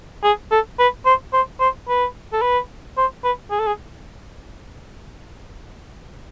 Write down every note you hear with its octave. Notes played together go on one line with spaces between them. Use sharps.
G#4
A4
B4
C5
C5
C5
B4
A4
B4
C5
B4
G#4
A4
G#4